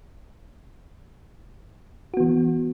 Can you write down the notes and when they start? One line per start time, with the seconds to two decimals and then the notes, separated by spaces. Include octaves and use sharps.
2.14 F#4
2.17 B3
2.20 E3